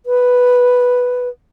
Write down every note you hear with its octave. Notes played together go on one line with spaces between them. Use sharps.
B4